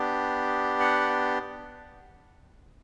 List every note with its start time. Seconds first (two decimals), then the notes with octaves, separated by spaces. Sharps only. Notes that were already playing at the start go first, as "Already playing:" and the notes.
Already playing: B3 D4 G4
0.80 F#5